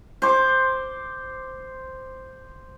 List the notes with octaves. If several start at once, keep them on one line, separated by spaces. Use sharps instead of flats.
C5 D6